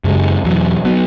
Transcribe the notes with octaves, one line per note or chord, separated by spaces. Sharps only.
F#2 C#3 G#3
E2 B2 F#3
F#3 B3